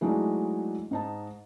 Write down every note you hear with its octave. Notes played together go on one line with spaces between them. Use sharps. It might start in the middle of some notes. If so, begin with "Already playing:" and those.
E3 F#3 G#3 A3 D4 D#4
G#2 D#4 A5